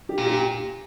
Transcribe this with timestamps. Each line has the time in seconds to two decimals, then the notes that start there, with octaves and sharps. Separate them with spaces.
0.09 G4
0.18 A#2
0.26 G4